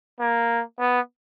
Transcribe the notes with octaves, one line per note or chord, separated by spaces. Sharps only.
A#3
B3